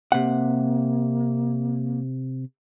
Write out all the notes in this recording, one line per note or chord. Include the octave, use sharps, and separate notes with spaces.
C3 A#3 F#5